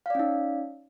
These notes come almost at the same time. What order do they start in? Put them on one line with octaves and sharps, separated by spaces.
F5 D5 C#4 D#4